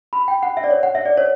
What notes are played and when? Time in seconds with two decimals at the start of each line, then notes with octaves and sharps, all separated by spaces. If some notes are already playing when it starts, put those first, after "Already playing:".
0.13 B5
0.28 G5
0.43 F#5
0.57 E5
0.64 D5
0.71 C#5
0.83 F#5
0.95 E5
1.06 D5
1.17 C#5